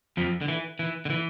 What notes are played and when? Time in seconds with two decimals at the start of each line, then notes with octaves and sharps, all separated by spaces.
0.17 F2 F3
0.41 D3
0.48 E3
0.79 E3
1.05 D3
1.10 E3